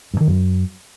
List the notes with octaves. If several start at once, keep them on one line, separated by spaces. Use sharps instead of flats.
G2
D#3
F#2